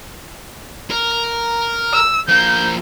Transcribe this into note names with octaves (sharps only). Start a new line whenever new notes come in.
A#4
E6
F3 A#3 G6